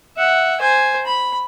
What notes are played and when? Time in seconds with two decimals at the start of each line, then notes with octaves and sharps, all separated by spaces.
0.17 E5 F#5
0.61 C5 G#5
1.06 B5